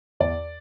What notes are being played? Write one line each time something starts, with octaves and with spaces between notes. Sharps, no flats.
E2 D5